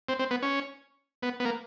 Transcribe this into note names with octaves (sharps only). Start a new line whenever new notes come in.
C4
C4
B3
C#4
B3
B3
A#3